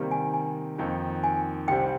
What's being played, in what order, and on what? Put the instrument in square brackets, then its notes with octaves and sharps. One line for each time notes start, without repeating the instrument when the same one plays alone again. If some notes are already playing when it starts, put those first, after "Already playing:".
Already playing: [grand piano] C3 D#3 G3 A#3
[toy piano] G#5
G#5
[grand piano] F2 D#3 A#3 D#4
[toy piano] G#5
[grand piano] C2 C3 G3 C4 [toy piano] G5